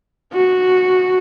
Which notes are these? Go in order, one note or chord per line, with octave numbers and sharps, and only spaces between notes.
F#4